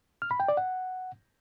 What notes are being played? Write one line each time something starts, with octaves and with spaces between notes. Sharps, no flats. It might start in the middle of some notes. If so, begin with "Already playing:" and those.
F6
B5
G5
D5
F#5